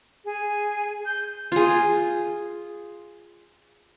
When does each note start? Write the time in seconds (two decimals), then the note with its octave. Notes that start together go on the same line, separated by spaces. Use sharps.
0.25 G#4
1.06 G6
1.52 F4 G#4